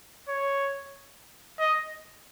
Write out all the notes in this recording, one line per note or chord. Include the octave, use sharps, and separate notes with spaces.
C#5
D#5